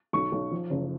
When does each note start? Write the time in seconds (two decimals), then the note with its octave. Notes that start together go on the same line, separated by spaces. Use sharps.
0.13 B1 C#6
0.32 B1
0.51 F3
0.70 F#1